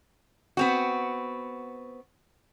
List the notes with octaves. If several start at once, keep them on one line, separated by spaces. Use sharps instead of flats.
B3 C4 F#4